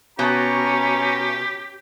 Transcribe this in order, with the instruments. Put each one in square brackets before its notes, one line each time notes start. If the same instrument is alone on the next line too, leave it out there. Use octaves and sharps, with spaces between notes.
[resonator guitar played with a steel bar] B2 [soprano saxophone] C#4 [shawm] G4 [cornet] A#5